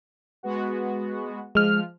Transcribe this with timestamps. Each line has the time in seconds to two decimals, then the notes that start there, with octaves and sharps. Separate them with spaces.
0.43 G#3 B3 F#4
1.55 F3 G#3 F6